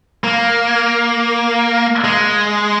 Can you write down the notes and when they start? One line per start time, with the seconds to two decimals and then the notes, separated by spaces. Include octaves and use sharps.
0.24 A#3
2.04 G#3